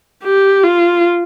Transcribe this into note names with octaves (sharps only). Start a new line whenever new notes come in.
G4
F4